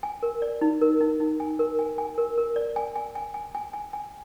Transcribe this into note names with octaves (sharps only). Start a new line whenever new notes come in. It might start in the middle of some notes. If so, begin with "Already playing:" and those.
G#5
A#4
D5
D#4
A#4
D#4
D#4
G#5
A#4
G#5
G#5
A#4
A#4
D5
G#5
G#5
G#5
G#5
G#5
G#5
G#5